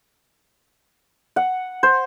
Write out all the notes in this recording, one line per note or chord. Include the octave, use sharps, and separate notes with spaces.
F#5
C5